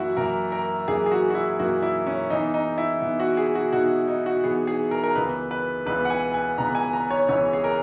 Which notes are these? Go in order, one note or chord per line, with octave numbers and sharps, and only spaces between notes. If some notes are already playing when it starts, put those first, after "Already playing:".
Already playing: F#2 E3 A#3 E4 F#4
F#2 E3 A#3 A#4
A#4
F#2 E3 A#3 G#4
G#4
F#4
F#4
E4
F#2 E3 A#3 F#4
E4
C#4
G#2 E3 B3 D#4
D#4
E4
G#2 E3 B3
F#4
G#4
F#4
G#2 E3 B3 F#4
D#4
F#4
G#2 E3 B3 G#4
G#4
A#4
A#4
C#2 C#3 E3 B3 B4
B4
C#2 C#3 E3 B3 B4
F#5
G#5
G#5
C#2 C#3 E3 B3 A#5
G#5
A#5
C#5
C#2 C#3 E3 B3 C#5
G#4
A#4